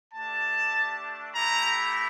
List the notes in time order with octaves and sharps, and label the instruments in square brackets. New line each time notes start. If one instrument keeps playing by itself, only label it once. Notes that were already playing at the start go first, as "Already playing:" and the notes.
[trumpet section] A3 D4 G4 A5
A3 E4 G4 A#5